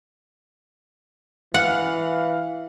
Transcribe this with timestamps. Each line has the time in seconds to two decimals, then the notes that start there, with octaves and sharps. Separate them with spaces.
1.54 E3 F5 F#5 F6